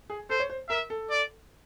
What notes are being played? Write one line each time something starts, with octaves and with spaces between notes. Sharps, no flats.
G#4
A4 C5
C#5
C5
A#4 E5
A4
D5